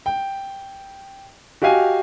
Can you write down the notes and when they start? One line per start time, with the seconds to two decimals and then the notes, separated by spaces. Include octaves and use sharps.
0.06 G5
1.62 F#4 G4 D#5 F5 G#5